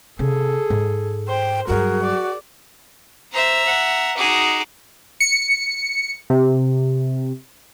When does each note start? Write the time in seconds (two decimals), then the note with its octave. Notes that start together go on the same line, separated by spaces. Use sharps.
0.19 C3 C#4 G#4 A4
0.70 G#2
1.28 C5 G5
1.67 G2 F#3 F#4 G#4 A#4
2.03 D5
3.33 C5 E5 A#5
3.65 F#5
4.17 D#4 F#4 G#4 D6
5.20 C#7
6.30 C3